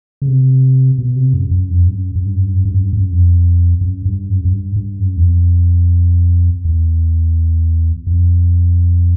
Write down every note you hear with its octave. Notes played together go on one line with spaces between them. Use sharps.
C#3
C3
B2
C3
F#2
F#2
F2
G2
F#2
F#2
G2
F#2
G2
F#2
G2
F#2
G2
F#2
F2
F#2
G2
F#2
F#2
G2
G2
F#2
E2
F2
E2
F2